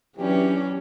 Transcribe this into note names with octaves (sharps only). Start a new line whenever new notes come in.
E3 F#3 C#4 D4 G4